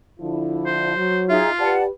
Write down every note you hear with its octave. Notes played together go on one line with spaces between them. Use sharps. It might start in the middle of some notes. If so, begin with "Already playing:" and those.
D3 F3 E4
C5
F#3
D#4 F4 G#4 E5
G4 B4 D5 F#5 A5